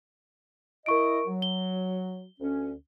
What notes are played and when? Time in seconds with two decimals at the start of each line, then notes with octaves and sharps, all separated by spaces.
0.86 E4 A#4 D#5 C#6 D7
1.26 F#3
1.42 G7
2.40 D2 C#4